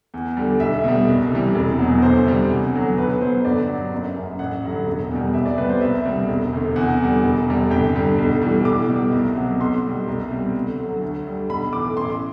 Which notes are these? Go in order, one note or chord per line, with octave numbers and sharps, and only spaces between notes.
E2
D3 G3
B1 E5
B2 G3
C2
C3 E3 G3
E1
E2 B2 F#3
D2 C5
C3 G3
E2
D3 F#3
B1 B4
B2 F#3 C5
G1 D5
G2 F#3
F#1
F#2 F#3
A1 F#5
G2 D3 F#3
E1
E2 B2 G3
C2 E5
D5
B2 G3 B4
C5
C2 E5
B2 G3
E1
D2 C3
E2 F#5
D3 G3
E1
E2 C3 G3
G1 G5
G2 D3 G3
B1
A2 E3 G3
B1 D6
B2 G3
C2
B2 F#3
B1 C6
B2 G3
C2
B2 G3
D2
D3 F#3
D2
D3 G3
B1 B5
A2 E3 D6
A1 C6